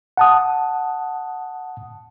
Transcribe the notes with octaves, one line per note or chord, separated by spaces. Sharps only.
F#5 A5 D#6